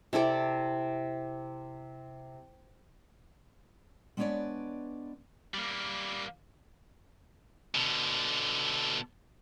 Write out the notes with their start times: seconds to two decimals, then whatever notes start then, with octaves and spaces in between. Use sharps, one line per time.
0.13 C3 E4 A4 D5
4.17 G#3 B3 D4 B4 C#5 D5
5.54 G3 A#3
7.75 B2 D3